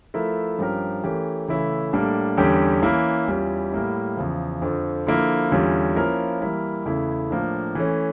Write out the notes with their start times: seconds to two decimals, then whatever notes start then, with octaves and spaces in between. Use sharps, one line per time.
0.14 F3 A3 E4 A#4
0.59 G2 F3 C#4 G4 A#4
1.03 E3 A3 C#4 G4 A#4
1.48 C#3 E3 A3 C#4 E4
1.93 A2 G3 A#3 D4 A4
2.37 E2 D3 G3 C#4 G4
2.83 E3 A#3 C#4 E4
3.28 E2 E3 G3 C#4 F4
3.72 A2 G3 A#3 E4
4.17 E2 C#3 F3
4.62 F2 D3 F3
5.07 D3 F3 A#3 E4
5.51 E2 D3 G3 C#4 F4
5.96 F3 A#3 C#4 E4 A#4
6.41 E3 G3 A#3 E4 A#4
6.86 E2 C#3 E3 A3 E4
7.30 A2 F3 A#3 D4
7.75 E3 A3 C#4